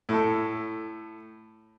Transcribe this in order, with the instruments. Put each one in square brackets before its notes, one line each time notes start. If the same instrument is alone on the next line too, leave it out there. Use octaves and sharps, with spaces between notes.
[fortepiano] A2 A4